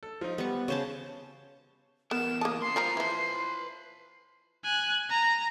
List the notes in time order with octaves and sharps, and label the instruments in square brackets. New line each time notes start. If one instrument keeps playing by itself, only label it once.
[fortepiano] A4
F3 D#4
[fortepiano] G3 [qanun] B3 C#6
[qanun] C#3 C5 A5 [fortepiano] C#5
[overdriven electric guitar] E2 A#4 [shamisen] B3 [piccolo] E7
[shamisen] A#3 A5 [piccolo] D#6
[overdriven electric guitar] C#3 C6 [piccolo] C7
[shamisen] F3 A#4 A#5 [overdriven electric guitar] B3 F4
[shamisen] E3 F3 [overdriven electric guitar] B4 C6
[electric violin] G#5 F#6
A#5